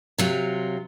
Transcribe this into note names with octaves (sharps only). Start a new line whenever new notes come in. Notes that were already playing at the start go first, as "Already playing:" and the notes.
C3 F#3 F4